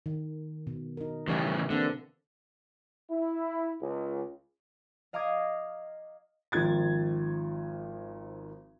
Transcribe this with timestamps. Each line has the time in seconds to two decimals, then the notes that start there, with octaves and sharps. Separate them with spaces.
0.06 D#3
0.67 B2
0.97 D#4 A#4
1.28 A2 C#3 E3 G3 G4 E5
1.70 D3 A#3 C4 A4
3.10 E4
3.82 C#2
5.13 D#5 F5 A#5 D6 D#6 G#6
6.52 G#1 D#3 F3 G#6 A6